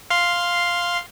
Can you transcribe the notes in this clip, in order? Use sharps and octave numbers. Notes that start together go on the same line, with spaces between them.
F5 C6